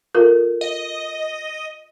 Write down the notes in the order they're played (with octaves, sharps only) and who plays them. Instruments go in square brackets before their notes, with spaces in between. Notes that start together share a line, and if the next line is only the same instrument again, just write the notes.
[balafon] F4 A4 A#4
[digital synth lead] D#5